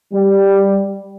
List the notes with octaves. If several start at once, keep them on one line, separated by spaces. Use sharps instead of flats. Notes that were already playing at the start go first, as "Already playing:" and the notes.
G3